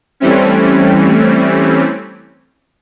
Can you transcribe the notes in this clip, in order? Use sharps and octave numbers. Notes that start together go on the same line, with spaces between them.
E3 G3 A3 C4 C#4